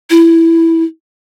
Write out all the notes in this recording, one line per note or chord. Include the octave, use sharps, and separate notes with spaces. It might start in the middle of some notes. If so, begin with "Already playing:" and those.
E4